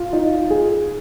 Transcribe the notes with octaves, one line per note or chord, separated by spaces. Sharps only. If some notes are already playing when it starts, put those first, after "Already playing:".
Already playing: F4
D#4
G#4